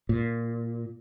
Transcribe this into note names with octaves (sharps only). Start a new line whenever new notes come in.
A#2